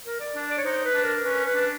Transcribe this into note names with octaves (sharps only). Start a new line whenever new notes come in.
A#4
D5
D4
D5
C#5
D#4 C5
B4
D4
A#4
C#4 B4
B4
D4